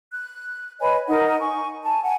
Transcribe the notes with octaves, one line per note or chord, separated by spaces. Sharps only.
F#6
B4 C#5 D#5 G#5
D#4 A#4 F#5
G#5 C#6
G#5 A5
F#5 G#5